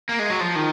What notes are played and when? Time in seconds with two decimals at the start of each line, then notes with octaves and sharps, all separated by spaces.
0.09 A#3
0.19 G#3
0.30 F#3
0.40 F3
0.56 D#3